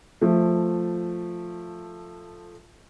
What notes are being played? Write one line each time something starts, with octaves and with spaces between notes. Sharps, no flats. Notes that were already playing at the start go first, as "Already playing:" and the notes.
F3 A3